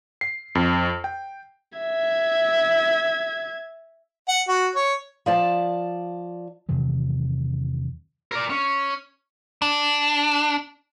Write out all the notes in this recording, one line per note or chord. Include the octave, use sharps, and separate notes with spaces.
C7
F2
G5
E5 G#6
F#5
F#4
C#5
F3 D5 A5
E2 C3 D#3 F#3
A#4 D5
C#4
D4